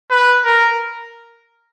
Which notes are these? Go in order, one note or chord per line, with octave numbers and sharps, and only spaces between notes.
B4
A#4